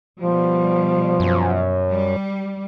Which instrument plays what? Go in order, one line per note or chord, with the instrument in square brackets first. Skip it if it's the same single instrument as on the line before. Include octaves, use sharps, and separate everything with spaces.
[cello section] B2 G3 [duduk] F3
[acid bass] F#2
[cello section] G3